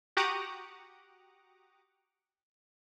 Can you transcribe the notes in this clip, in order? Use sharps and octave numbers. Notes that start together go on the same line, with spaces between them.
F#4 G4 F#5 A#5 D6 D#6